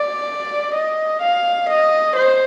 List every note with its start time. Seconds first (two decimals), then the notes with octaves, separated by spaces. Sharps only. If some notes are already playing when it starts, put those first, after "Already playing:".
Already playing: D5
0.74 D#5
1.22 F5
1.70 D#5
2.16 C5